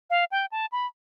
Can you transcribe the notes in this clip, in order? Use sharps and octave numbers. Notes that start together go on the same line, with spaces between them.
F5
G5
A5
B5